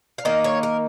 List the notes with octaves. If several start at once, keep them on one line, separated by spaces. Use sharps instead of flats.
F5
D#3 A#3 D#4 D#5
C#5
A#4